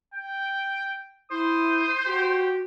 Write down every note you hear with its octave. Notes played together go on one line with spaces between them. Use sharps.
G5
E4 C5 D#6
F#4 G4